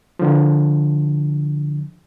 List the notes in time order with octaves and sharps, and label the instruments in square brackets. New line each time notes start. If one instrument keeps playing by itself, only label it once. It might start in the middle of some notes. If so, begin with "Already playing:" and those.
[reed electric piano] D3 F3